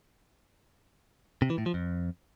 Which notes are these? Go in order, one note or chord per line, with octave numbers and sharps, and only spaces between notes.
C3
E3
A2
F3
F2